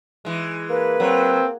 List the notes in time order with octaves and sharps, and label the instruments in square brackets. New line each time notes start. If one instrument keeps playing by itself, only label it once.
[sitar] E3 G#3
[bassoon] A#3 [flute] B4
[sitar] F#3 [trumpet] C4